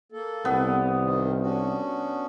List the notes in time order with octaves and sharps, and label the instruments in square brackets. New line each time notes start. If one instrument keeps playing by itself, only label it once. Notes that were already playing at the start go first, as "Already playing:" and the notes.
[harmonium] A#3 A4
[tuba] C2 [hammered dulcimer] B3
[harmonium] C3 D#3
C#4 D4 F#4